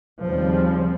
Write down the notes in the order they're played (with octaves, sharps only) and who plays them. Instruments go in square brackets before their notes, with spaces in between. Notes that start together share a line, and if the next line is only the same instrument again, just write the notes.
[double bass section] D#2 C#3 F3 G3 C4